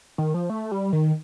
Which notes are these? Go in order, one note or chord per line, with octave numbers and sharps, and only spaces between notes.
D#3
F3
A3
G3
D#3